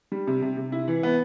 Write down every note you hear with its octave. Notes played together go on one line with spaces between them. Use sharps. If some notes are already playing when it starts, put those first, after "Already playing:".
G3
C3
C3
C3
E4
E3
B3